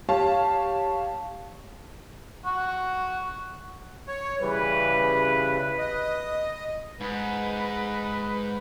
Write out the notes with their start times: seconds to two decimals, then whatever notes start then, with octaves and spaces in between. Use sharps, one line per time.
0.09 G4 C#5 F5 A5
2.45 F#4
4.08 C#5
4.40 C#3 E3 G3 B4
5.79 D#5
7.00 G#2 B4